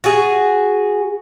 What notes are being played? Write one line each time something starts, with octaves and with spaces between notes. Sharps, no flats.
F#4 G#4